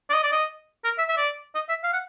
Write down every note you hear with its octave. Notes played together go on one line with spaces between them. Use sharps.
D5
D#5
D5
D#5
A#4
E5
E5
D5
D#5
E5
F5
F#5